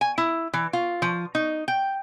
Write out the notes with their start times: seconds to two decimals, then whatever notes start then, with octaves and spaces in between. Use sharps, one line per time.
0.01 G#5
0.18 E4
0.54 E3
0.73 F4
1.02 F3
1.35 D#4
1.68 G5